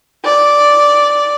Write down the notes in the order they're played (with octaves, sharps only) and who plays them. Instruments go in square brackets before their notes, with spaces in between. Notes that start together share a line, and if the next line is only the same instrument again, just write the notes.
[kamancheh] D5